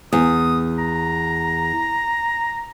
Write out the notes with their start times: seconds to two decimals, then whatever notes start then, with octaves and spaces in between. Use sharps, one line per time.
0.13 E2 D#6
0.79 A#5